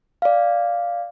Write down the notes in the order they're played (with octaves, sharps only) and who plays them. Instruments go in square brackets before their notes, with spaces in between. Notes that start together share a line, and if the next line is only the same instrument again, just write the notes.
[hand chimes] D5 F5